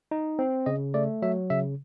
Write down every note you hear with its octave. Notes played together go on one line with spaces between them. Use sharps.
D#4
C4
C#3 D#5
A3 D5
F#3 E5
C#3 E5